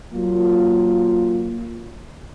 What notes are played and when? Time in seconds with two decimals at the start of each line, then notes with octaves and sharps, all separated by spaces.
0.14 F#3 A#3 F4